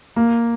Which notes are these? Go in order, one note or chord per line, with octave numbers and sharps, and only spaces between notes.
A#3